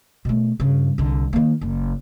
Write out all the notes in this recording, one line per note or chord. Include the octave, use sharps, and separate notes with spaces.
B2 A3
G2 C#3
C2 D3
D#3 A#3
F#1